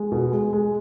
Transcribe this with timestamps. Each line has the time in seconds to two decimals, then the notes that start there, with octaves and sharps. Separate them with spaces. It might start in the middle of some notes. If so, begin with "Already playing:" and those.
Already playing: G#3
0.12 B2
0.32 G#3
0.53 G#3